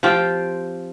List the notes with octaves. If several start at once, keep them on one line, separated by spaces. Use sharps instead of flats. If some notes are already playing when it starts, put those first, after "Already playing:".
F3 C4 F4 G4